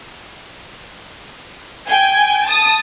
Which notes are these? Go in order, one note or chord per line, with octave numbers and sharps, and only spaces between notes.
G5 G#5
A5 D#6